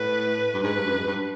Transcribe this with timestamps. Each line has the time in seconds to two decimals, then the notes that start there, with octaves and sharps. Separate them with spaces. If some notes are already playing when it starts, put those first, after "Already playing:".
Already playing: A2 B4
0.54 G2
0.63 G#2 B4
0.76 G2
0.86 F#2
0.98 G#2
1.07 G2